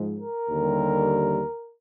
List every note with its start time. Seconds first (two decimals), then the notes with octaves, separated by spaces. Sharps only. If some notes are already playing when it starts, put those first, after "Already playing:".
Already playing: G#2 F3 G#3
0.19 A#4
0.49 D#2 D3 G3